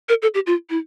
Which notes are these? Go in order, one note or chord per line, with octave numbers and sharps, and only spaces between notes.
A#4
A4
G4
F4
E4